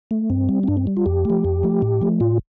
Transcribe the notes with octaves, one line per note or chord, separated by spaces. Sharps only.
A3
G2 C4
G3
C4
G2 D4
C4
G3
F4
F2 G4
F3 A3
F2
F3 A3
A2
F3 A3
A2 F4